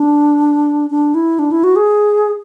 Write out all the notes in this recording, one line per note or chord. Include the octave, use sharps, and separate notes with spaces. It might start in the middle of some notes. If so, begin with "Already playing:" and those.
Already playing: D4
D4
E4
D4
E4
F#4
G#4